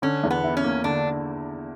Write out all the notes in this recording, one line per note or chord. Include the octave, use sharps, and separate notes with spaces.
D3 C#4
E2
B3
E4
C#4
A#3
D3 D4